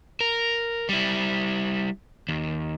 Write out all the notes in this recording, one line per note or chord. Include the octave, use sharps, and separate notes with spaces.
A#4
G3 E4
D#2